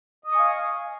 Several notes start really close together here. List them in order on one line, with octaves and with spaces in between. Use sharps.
D#5 D#6 C#6 G#5 F5